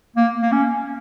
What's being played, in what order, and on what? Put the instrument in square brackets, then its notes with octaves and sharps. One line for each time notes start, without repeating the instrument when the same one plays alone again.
[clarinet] A#3
A#3
C#4